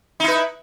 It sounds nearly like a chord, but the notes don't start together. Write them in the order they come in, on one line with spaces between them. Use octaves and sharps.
D#4 E4 B4